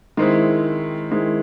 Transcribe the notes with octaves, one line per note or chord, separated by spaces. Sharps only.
D#3 G#3 C4 E4
D#3 G#3 C4 E4